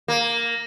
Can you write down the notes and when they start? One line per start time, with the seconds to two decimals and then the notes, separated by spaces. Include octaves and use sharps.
0.08 A#3